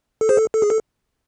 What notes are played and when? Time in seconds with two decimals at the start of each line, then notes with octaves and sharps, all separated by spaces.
0.21 A4
0.29 G#4 C5
0.37 A4
0.54 A4
0.62 G#4
0.70 A4